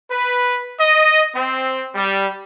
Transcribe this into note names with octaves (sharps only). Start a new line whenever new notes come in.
B4
D#5
C4
G3